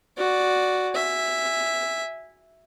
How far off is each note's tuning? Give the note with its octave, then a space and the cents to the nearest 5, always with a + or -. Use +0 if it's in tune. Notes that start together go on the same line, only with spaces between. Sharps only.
F#4 +0 D5 +0
E5 +0 G#5 -15